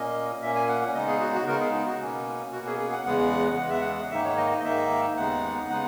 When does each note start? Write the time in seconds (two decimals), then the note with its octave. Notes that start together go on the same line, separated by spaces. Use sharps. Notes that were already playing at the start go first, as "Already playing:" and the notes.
Already playing: A#2 A#3 C#4 D#5
0.42 A#2 A#3 C#4 E5
0.55 G#5
0.68 F#5
0.81 F#5
0.94 C#3 G#3 B3 D#4 D#5
1.07 G#4
1.20 F#4
1.34 F#4
1.47 C#3 G#3 B3 D#4 A#4
1.60 G#4
1.74 D#4
1.87 F#4
2.00 B2 A#3 C#4
2.52 B2 A#3 C#4 F#4
2.67 G#4
2.79 G#4
2.92 F#5
3.06 E2 C#3 G#3 B3 F#5
3.58 E2 C#3 G#3 B3 F#5
3.69 E5
3.81 F#5
4.11 G#2 D#3 A#3 D#4 E5
4.25 C#5
4.38 D#5
4.51 D#5
4.64 G#2 D#3 A#3 D#4 E5
5.17 D#2 C#3 G#3 B3 D#4 F#5
5.69 C#3 G#3 B3 D#4 F#5